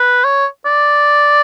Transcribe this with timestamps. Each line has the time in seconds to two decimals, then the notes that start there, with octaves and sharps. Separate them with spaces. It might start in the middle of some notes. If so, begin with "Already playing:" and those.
Already playing: B4
0.24 C#5
0.66 D5